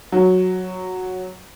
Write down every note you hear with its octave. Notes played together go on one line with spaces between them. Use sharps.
F#3